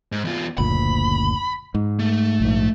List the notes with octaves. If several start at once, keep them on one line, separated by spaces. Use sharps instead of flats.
G#2
E2 F4
F#1 D2 A#2 B5
G#2
A3
A#1 G#2